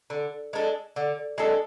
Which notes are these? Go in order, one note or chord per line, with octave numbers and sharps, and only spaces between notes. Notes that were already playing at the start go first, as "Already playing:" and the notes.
D3
G#3 D4 A4
D3
G#3 D4 A4